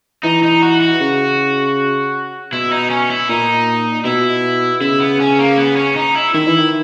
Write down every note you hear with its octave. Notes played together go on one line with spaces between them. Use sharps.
E3 D#4
D#4
F#4
F#4
C#3
B2 E4
D#4
C#4
E4
A#2 D#4
B2 E4
C#3 E4
B3
C#4
A#3
B3
C#4
D#4
E4
D#3 E4
E3
D#3